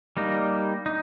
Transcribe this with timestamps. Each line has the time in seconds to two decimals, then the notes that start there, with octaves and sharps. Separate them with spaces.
0.17 G3 A#3 D#4
0.86 D#4